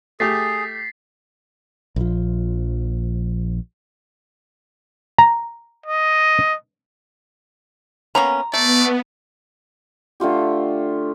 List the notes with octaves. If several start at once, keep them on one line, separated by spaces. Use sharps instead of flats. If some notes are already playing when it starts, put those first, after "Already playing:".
A3 G4 G#4 A6 B6 C7
A#1 F3
A#5
D#5
A#3 B3 C#4 A#5
A3 B3 D5
D3 A3 F4 G4